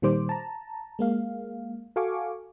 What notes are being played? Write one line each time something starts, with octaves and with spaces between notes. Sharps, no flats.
A#2 D#3 G3 C5 D6
A5 A#5
G#3 A#3 F5
F#4 A4 F5 G#5 C#6 D6